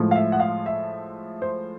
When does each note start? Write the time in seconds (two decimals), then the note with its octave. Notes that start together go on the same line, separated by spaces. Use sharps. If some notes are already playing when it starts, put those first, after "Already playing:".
Already playing: A2 F3 G#3
0.11 F5
0.16 E5
0.32 F#5
0.40 F5
0.66 E5
1.42 C5